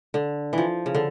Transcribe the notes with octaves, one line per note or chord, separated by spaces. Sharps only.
D3
E3 F3
C#3
D3